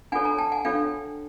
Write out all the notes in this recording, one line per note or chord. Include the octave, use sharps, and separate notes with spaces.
D4 F4 A4 C#5 F#5 G#5
G#5 A#5
G5 A5
F#5 G#5
D4 F4 A4 C#5 F5 G5